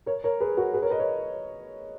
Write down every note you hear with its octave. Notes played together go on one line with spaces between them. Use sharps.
A#4 C#5
A#4 C#5
G#4 B4
F#4 A#4
G#4 B4
A#4 C#5
B4 D#5
A#4 C#5